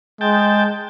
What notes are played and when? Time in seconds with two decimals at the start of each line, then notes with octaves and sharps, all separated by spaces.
0.21 G#3 G5 A5